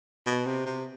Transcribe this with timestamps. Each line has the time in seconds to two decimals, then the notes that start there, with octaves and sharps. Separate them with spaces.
0.27 B2
0.46 C3
0.66 C3